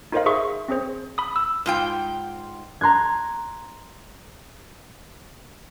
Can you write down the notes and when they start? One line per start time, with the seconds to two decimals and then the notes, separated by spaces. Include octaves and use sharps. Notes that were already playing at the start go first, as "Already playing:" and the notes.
0.12 D#4 F4 A#4 C5 D#5 F5
0.26 G#4 C5 E5 C6 C#6
0.68 C4 C#4 G#4 C5
1.18 B5 D#6
1.36 E6
1.66 G#2 F4 G5
2.81 A#5 C6 F#6 G#6